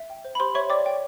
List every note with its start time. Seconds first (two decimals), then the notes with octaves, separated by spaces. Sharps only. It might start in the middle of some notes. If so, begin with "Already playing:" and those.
Already playing: E5
0.10 G5
0.25 C5
0.35 B5
0.40 G4 C5 C6
0.55 C#5 E5 C#6
0.70 D5 G5 D6
0.86 G5